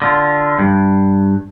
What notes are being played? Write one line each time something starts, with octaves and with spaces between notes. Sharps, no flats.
D3 F4
G2